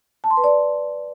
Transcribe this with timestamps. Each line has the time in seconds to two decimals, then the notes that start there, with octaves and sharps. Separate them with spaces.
0.24 A5
0.30 C6
0.37 B4
0.44 D5